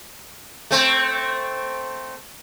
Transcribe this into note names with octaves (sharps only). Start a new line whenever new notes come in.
A3 C4